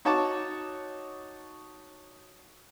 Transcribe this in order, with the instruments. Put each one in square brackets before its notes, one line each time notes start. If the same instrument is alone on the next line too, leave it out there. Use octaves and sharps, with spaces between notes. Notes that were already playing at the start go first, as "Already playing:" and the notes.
[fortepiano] D#4 F#4 C#5 A5 C#6 D6